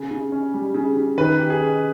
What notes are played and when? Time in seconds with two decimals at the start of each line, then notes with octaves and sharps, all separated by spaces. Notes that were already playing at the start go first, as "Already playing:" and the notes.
Already playing: C#3
0.11 C#3
0.32 C#4
0.54 G3
0.74 C#3
0.97 C#3
1.18 D#3 B4
1.39 G4
1.50 G#4
1.61 C#4